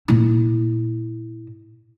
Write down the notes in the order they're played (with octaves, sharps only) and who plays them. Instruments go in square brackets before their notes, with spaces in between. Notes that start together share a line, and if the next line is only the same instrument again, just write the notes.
[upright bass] A#2 E4